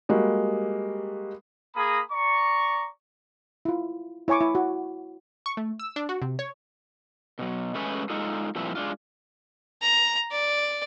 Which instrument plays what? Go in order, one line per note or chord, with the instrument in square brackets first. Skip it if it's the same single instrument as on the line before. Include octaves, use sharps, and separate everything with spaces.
[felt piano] G3 G#3 A#3 F#4
[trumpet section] A#3 G#4 A#5 B5 D#6
D5 A#5 C#6
[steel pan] E4 F4
E4 C#5 G#5 C#6 D6
E4
F#4
[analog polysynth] C#6
A3
E6
D4
F#4
C3
C#5
[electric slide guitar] B2 F#3
G#3 A3 C#4 B4
G#3 D#4 F4 A4
G2 A#2 F3 C4 E4
G#3 D4 F4
[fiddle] A#5
D5